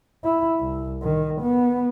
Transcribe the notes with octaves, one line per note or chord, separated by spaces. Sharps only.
E4
C2
D#3
B3